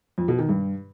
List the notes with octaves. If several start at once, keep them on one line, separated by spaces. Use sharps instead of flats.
F2
B2
D#3
G2